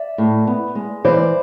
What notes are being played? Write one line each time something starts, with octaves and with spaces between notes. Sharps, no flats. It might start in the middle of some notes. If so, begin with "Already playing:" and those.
Already playing: D5 E5
A2
B3
G#3
E3 C5 D5